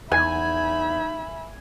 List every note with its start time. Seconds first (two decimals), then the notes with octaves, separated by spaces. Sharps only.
0.12 E2 D#4 E5 G#5 B5